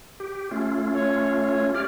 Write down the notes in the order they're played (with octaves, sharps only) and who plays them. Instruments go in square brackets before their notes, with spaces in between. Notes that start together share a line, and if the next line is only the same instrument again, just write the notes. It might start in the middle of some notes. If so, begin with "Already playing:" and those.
[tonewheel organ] G4
A3 C#4 F4
[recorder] C#5
[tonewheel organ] G4 D5 [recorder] F6